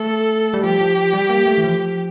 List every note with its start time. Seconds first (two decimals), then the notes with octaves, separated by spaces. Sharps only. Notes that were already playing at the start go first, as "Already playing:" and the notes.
Already playing: A3 A4
0.54 G3
0.64 F3 G4
0.80 F3
0.97 F3
1.14 G3
1.29 A#3
1.46 A3
1.58 E3
1.64 F3